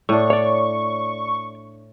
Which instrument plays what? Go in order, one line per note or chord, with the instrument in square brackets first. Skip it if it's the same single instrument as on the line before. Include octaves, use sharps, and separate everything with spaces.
[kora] A2 D4 [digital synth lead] C#6
[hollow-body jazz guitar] C#5 D5